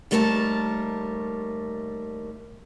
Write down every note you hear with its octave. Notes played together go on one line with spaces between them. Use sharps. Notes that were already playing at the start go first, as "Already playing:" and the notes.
D#2 G3 A3 A#4 C#5 A5